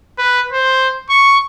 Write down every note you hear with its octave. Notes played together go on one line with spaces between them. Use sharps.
B4
C5
C#6